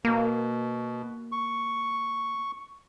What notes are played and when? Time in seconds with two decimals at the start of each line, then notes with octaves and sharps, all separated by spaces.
0.05 B2 A#3
1.32 C#6